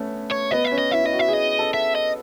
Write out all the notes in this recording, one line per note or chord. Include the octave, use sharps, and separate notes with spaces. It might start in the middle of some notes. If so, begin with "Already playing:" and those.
Already playing: A3 B3 C#4
C#5
B3 D#5
E5
C#4
D#5
E4 E5
E4 D#5
F#4
E5
G#4 D#5
A4
E5
D#5